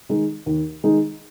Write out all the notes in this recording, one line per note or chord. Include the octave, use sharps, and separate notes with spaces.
D#3 G#3 D#4
D#2
D#3 G#3 D#4